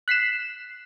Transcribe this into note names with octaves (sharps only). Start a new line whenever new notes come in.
F#6 B6 C7 E7